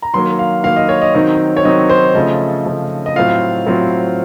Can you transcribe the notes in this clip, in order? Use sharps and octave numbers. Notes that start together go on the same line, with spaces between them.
A#5
D#3 F#3 A#3 C6
F5
D#3 F#3 A#3 F5
D#5
C#5
D#5
D#3 F#3 C4 D#4
C#5
D#3 F#3 C4 D#4 D#5
C5
C#3 F3 A3 D#5
C#3 F3 A3
D#5
A2 F#3 C4 F4 F5
A2 F#3 C4 F4